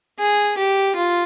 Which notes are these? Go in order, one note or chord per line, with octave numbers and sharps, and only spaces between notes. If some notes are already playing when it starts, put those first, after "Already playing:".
G#4
G4
F4